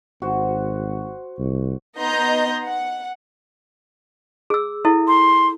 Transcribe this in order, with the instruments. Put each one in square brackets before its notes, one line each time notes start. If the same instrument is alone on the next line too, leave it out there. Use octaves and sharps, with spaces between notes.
[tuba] G#1 [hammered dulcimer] F#4 C5
[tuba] C2
[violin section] B3 D#4 D#5 A#5 C6 G6
F#5
[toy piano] G#4 E6
E4 A4 E5
[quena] C6